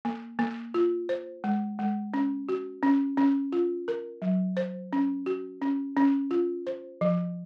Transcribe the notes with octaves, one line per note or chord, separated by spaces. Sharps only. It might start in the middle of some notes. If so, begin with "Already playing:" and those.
A#3
A#3
F4
C5
G#3
G#3
C#4
F#4
C#4
C#4
F4
A#4
F#3
C5
C#4
F#4
C#4
C#4
F4
C5
F3